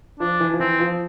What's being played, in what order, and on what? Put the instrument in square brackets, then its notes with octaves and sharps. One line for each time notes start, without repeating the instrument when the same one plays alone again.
[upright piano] F3 [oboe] D4
[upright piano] E3
F3
[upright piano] E3 [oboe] C4
[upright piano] F3